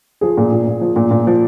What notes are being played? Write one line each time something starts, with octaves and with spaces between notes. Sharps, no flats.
F3 G#4
A#2
A#2
A#2
F3
A#2
A#2
F3